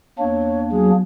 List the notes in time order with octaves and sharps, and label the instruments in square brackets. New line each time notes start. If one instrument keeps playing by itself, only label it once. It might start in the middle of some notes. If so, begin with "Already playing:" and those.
[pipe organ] E2 A#3 D4 [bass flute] C#5
[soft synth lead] F#3 [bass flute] G#4